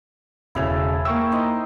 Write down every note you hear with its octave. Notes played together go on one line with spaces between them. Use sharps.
E1 C#3 E4 G#4 A4 F7
A#3 G5 C#6 E6
D#4 C5 D#5